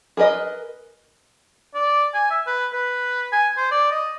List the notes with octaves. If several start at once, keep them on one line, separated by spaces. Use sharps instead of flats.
G#4 A#4 B4 D#5
D5
G#5
E5
B4
B4
G#5
C5
D5
D#5